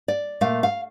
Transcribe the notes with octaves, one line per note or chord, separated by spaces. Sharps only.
D5
A#2 A3 F5
F5